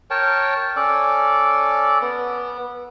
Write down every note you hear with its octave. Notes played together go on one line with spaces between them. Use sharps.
A#4 C#5 G5 A5
C#4 A4 D5
B3